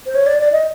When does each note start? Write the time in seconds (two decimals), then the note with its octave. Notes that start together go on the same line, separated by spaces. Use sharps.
0.06 C5
0.15 C#5
0.27 D5
0.40 D5
0.52 D#5